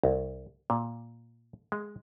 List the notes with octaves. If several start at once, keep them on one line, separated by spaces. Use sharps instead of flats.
C2
A#2
G#3